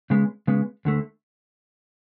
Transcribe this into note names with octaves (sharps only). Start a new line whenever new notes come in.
C#3 G#3 B3
C#3 G#3 B3
D2 D3 A3